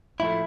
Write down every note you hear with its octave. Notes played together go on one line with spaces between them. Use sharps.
A2 F3 A3 E4